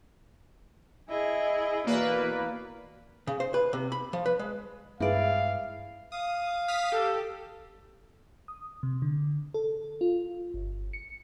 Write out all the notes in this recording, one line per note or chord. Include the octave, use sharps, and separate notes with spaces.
E4 G#4 D#5
B2 E3 A#3 B4 D5
C#3
C5
B4
C3
B5
F3
B4
G#3
G2 G#3 E4 B4 D5 F5
F5 D#6
D#6 F6 B6
G4 A4
D#6
C3
D3
A4
F4
G1
C#7